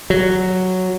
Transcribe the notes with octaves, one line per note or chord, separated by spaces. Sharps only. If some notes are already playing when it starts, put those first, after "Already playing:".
F#3